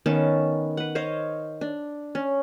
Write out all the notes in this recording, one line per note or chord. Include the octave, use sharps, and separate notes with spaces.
D#3 B3 C#4 A5
B4 F#5
C5 C#5 D#5 F5
D4
C#4